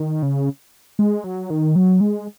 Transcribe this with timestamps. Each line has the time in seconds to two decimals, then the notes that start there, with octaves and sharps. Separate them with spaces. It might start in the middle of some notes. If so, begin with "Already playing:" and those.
Already playing: D#3
0.23 C#3
0.99 G#3
1.24 F#3
1.50 D#3
1.76 F#3
2.01 G#3